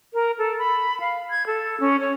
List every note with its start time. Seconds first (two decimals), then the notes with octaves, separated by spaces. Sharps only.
0.14 A#4
0.38 A4
0.59 B5
1.00 F5
1.30 G#6
1.46 A4
1.80 C#4
2.00 C#5